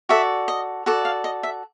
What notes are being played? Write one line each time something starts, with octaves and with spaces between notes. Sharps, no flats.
F#4 A4 D5 E5
D#5
F#4 A4 D5
F5
D#5
E5